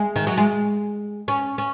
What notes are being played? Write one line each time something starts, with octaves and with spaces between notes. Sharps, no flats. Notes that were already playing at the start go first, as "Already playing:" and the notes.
Already playing: G#3
D#3
F#3
G#3
C#4
C#4